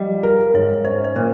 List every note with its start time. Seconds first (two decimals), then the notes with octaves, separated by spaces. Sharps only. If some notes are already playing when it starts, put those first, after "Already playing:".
Already playing: F3 G3 D#5 F5 G5
0.23 A#4
0.54 G#2 C#5
0.84 C#4 C5
1.04 C5
1.16 A#2 A#4